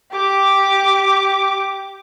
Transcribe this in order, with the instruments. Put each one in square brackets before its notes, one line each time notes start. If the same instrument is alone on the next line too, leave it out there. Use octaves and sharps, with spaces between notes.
[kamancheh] G4 D6